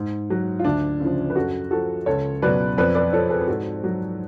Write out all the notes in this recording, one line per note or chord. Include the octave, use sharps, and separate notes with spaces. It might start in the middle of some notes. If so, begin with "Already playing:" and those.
Already playing: G#2
F#3
F4
D2 D4
C#3 F3
B4
F#2 F#4 A4
F3 F#4 A4
C#2 A4 C#5
B2 F#3 B4 D5
F2 B4 D5
B4 D5
F3 A4 C#5
G#4 B4
B4
G#2 F#4 A4
F#3